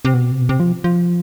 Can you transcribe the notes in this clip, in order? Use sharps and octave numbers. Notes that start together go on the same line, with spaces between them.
C3
B2
C3
B2
C3
F3
F3